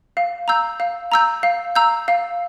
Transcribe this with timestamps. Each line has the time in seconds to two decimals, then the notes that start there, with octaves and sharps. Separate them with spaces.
0.17 F5
0.48 A#5 E6 G6
0.80 F5
1.12 A#5 E6 G6
1.43 F5
1.75 A#5 E6 G6
2.08 F5